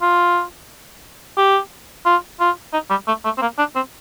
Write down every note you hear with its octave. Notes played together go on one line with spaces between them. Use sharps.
F4
G4
F4
F4
D#4
G3
A3
A3
C4
A#3
D4
C4